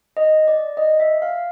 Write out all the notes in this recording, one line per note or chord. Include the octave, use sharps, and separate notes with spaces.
D#5
D5
D#5
E5
F5